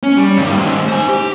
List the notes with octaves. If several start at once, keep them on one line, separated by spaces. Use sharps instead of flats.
C#4
G3
G2 D#3
G#3 C4
C5 G#5
G4